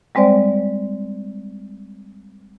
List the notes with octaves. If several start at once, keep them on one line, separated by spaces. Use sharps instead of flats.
G3 G#3 C4 C5 D5